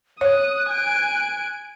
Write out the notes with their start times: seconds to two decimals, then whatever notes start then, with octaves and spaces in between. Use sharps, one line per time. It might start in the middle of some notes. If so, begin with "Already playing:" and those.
0.21 C#5 D#6 F#6
0.70 G#5 D7